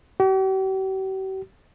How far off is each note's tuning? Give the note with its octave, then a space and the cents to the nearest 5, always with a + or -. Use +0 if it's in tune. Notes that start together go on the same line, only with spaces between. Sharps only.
G4 -45